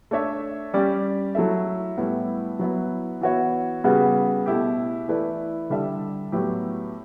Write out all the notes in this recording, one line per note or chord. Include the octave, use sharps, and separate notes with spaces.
A3 D4 A4 C#5 E5
G3 C#4 G4 D5
F#3 A3 E4 A4 E5
A2 G3 B3 E4
F#3 B3 E4 B4
E3 B3 F#4 C#5 E5
C#3 G3 B3 F#4
B2 A3 E4 G4
E3 A3 E4 B4 D5
D3 G3 D4 A4 E5
A2 F#3 B3 E4 G4